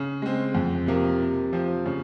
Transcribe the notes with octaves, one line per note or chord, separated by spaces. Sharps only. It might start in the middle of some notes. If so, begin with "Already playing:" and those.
Already playing: C#3
G#3 C4
F2
C3 F3 A#3
C3
F3 C4
C#3